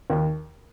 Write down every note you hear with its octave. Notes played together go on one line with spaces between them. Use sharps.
D#2